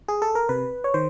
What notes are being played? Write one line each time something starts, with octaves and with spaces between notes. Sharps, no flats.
G#4
A4
A#4
C3 B4
C#5
D#3 C5